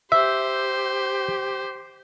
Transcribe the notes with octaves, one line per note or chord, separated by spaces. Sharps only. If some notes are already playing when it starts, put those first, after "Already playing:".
G4 C5 E5